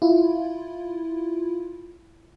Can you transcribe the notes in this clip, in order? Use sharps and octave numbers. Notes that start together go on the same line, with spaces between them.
E4 F4